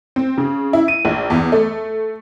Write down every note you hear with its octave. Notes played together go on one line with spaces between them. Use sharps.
C4
C#3
E4
D#7
A#1
E2
A3